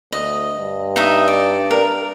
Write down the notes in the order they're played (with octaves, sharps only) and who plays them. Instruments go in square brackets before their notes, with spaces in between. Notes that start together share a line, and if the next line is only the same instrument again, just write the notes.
[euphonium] D2 [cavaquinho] D#5
[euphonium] G2
[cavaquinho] D#4 E5 D#6
D5
A#4